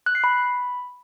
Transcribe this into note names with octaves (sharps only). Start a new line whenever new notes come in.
F#6
C7
B5